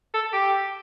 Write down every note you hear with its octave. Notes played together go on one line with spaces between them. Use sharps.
A4
G4